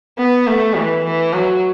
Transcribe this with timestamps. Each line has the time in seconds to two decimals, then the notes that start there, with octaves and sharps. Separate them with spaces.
0.18 B3
0.47 A3
0.75 E3
1.05 E3
1.33 F#3